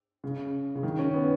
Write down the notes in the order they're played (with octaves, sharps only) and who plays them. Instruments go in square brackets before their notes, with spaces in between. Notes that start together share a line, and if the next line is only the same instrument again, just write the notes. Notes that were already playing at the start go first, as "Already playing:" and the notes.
[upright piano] C#3
C#3
D#3
C#4
B3